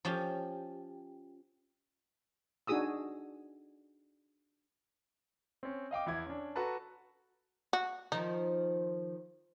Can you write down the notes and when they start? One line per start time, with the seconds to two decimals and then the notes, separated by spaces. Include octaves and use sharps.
0.05 F3 C#4 G4
2.67 D4 D#4 F#4 G#4 D#6 E6
5.63 C4 C#4
5.91 D#5 F5 G5 D6
6.06 E2 E4 G#6
6.26 C#4 D4
6.55 F#4 A4 B4 A5 A#5
7.73 F#4
8.12 D#3 F3 D#4